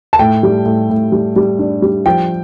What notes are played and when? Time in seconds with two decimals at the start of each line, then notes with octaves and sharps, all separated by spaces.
0.13 A5
0.19 A2 G5
0.43 G3
0.65 A2
0.90 A2
1.12 G3
1.36 G3
1.59 D4
1.82 G3
2.06 F3 G5